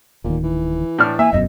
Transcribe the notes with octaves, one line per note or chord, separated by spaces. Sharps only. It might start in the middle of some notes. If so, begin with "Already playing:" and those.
D1 A#2 D#3
E3
A2 D4 F6
A#3 E5 G#5
E1 F#2 B2 D#5